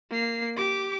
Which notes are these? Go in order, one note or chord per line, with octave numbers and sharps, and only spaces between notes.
A#3 C7
G4 D6